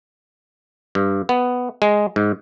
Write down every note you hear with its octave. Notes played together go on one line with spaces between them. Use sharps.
G2
B3
G#3
G#2